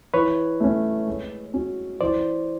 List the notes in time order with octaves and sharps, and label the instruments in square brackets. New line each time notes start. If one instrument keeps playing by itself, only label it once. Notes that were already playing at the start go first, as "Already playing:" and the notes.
[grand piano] E3 [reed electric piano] B4 C#5
[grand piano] A3 C#4
G#3
C#4 F#4
[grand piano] E3 [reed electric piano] C5 D5